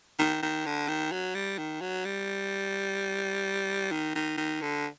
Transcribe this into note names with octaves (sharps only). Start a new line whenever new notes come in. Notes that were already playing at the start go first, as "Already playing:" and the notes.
D#3
D#3
D3
D#3
F#3
G3
D#3
F#3
G3
D#3
D#3
D#3
D3